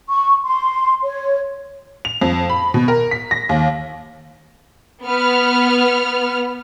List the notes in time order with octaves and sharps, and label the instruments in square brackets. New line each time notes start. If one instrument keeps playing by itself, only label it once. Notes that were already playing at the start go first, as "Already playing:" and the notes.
[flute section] C#6
C6
C#5
[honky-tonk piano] F7
F2
B5
B2
A#4
B6
A#6
D#2
[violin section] B3 F6